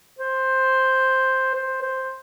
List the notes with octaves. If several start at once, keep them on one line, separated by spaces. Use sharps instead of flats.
C5
C5
C5